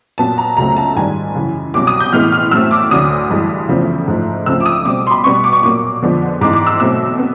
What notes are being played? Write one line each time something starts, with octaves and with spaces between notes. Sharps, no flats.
A#2 F#3 B3 A5
A#5
C#2 C#3 F#3 A3 C4 A#5
A5
G#2 D#3 G3 G#5
F#2 C#3 E3
C2 B2 F#3 D6
D#6
G6
A2 E3 G#3 B3 F6
F6
A2 F#3 A3 C4 E6
D6
D2 D3 F#3 D#6
G2 E3 G#3
E2 C#3 F3 A3 C4
G#2 F3 A3
C#2 C#3 F3 A3 C4 E6
D6
D#6
B2 G3 C4 D6
C6
B5
B2 G3 B3 C#6
D6
C#6
A#2 F#3 A#3 D6
F2 D3 F3 G#3 B3
G#2 E3 G#3 D6
D6
E6
B2 F#3 A3 C4 E6
B3